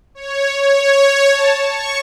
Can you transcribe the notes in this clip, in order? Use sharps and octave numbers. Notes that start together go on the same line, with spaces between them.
C#5
C#5
A5
C#6